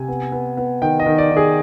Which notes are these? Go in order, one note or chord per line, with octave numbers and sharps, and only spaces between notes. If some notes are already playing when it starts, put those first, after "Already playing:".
Already playing: C3 G#5
B3
B3
B3
D#3 G5
D#5
D#3
D5
D#3
G#4